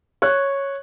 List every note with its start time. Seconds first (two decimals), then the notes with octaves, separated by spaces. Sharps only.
0.22 C#5 F#6